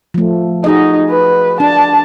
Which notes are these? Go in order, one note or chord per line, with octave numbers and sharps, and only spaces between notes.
F3 A3
D#4 F#4 G#4 D#5
B4
D4 A5